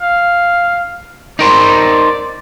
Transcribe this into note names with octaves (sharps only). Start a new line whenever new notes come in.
F5
D#4 A#4 C5 D5